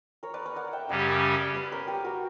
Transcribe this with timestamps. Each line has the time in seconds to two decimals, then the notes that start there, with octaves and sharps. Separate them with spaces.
0.23 A#4 C#5
0.34 B4 D5
0.46 A#4 C#5
0.56 D5 F#5
0.73 E5 G5
0.89 F#2 C#3 G3 C#4 G4 D5 F#5
1.55 B4 D5
1.72 A#4 C#5
1.88 G4 B4
2.04 F#4 A#4